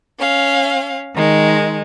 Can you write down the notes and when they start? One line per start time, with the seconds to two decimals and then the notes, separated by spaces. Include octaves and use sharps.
0.19 C#4 F5
1.14 D#3 G#3